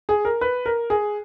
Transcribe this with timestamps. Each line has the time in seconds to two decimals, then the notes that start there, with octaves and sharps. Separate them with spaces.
0.09 G#4
0.25 A#4
0.41 B4
0.66 A#4
0.90 G#4